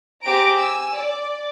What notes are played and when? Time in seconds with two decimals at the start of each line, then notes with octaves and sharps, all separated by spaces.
0.22 C4 G4 G#4 C5 A#5 D7
0.58 G#5 E6
0.93 D5